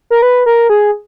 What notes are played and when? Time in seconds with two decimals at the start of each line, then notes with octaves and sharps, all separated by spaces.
0.10 A#4
0.22 B4
0.46 A#4
0.70 G#4